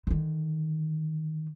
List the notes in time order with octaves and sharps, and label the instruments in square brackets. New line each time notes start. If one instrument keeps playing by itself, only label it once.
[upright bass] D3 D#3